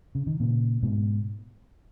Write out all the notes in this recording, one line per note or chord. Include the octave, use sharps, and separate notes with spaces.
C#3
D#3
A#2 C#3
G#2 B2